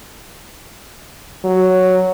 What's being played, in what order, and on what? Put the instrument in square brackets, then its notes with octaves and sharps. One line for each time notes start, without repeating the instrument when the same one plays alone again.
[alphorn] F#3